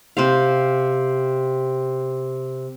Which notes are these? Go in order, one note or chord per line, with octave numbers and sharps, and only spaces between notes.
C3 C5 F5